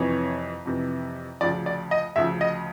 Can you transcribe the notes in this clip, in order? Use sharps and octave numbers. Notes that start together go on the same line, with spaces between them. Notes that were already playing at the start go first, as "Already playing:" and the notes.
Already playing: F2 C3 E3 C#5
F2 C3 E3
D2 C#3 F3 D5
D5
D#5
D2 C#3 F3 E5
D#5